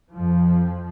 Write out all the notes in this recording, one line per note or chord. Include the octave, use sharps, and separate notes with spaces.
F2 F3